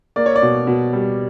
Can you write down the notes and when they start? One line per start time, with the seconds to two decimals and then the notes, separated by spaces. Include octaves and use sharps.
0.16 A#3 D5
0.26 C#5
0.36 D5
0.42 B2
0.67 B2
0.93 G3